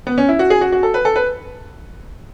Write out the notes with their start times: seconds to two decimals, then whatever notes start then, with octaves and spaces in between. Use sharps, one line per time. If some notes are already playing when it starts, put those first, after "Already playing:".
0.07 B3
0.18 C#4
0.29 E4
0.39 F#4
0.50 G#4
0.61 F#4
0.72 F#4
0.83 A4
0.94 B4
1.05 A4
1.16 B4